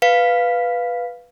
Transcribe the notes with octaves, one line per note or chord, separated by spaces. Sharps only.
B4 F5 B6